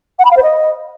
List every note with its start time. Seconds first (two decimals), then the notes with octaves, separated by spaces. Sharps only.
0.19 F#5
0.25 B5
0.31 F5
0.36 C5
0.42 D#5